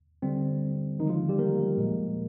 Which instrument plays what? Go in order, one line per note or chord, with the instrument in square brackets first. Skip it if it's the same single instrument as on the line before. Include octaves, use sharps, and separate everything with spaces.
[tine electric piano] D3 G3 C4
D3 D#3 F3 G#3 D#4
F3 F4
G3 G4
A#3 A#4
A#2 F3 G#3